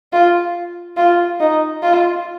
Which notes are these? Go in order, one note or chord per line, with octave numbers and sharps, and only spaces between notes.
F4
F4
D#4
F4